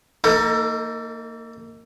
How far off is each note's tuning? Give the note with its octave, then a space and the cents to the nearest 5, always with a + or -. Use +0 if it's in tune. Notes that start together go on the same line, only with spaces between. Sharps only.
A#3 -25 D#4 +15 A4 +25